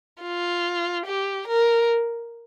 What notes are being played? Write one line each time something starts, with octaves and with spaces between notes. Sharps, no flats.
F4
G4
A#4